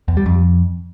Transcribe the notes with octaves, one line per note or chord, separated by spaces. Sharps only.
E2
G3
F2